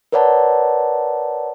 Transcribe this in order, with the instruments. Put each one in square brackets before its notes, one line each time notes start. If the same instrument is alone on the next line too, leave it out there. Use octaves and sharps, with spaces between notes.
[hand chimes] A#4 B4 C#5 D5 F#5 A5